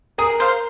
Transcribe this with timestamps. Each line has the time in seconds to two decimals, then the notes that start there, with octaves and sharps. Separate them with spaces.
0.18 G#4 A#4
0.40 C5 F5